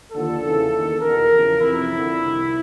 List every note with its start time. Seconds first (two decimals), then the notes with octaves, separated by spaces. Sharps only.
0.12 D#2 D3 F3 A4
0.42 E2 C#3 E3
0.72 D#2 D#3
1.01 E2 B2 A#4
1.31 E2 C#3 F3
1.60 F2 C3 E3 E4
1.90 F2 D3 F3
2.20 C2 C3 D#3